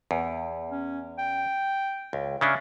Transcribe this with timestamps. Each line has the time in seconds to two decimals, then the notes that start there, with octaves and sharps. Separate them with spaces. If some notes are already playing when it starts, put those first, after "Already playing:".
0.11 E2
0.71 C#4
1.19 G5
2.13 C#2
2.41 C#3 C#4 D4 E5